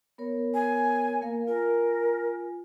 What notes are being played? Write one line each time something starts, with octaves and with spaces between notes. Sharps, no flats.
B3 A#4 C#5
G#5
A#3 A#4 F5
F4 A#4 G#5